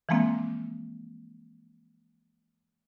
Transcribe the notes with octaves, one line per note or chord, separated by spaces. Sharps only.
E3 F3 G#3 A#3 C4